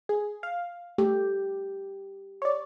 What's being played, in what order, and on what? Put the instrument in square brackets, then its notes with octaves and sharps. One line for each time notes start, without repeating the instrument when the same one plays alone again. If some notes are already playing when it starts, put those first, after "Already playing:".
[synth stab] G#4
F5
[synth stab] A3 [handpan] G4
[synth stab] C#5 D5